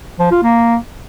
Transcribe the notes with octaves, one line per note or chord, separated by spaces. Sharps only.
F3
F4
A#3